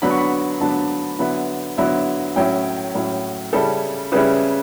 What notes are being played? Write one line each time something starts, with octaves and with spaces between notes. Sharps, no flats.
D3 F#3 B3 D4 B5
C#6
B5
D3 F#3 B3 D4 A5
D3 F#3 B3 E4
D3 F#3 B3 E4
A2 F#3 C#4 E4 G5
A2 F#3 C#4 E4
C#3 G3 C#4 E4 A4
C#3 G3 C#4 E4 B4